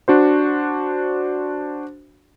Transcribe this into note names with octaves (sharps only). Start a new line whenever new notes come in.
D4 F#4 C5